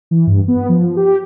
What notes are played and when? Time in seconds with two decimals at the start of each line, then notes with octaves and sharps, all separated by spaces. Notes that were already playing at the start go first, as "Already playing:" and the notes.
0.11 E3
0.27 G2
0.48 B3
0.69 F3
0.96 G4